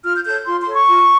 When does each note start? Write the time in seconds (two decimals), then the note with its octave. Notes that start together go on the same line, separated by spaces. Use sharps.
0.04 F4 F6
0.15 G6
0.25 A4 C#5 G6
0.46 F4 C6
0.60 C6
0.67 A4 C#5
0.74 C#6
0.88 F4